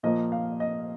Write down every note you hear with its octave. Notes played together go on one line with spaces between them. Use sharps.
A#2 F3 A#3 D#5
F5
D#5